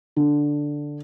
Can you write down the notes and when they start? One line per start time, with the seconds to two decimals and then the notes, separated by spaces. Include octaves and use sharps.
0.16 D3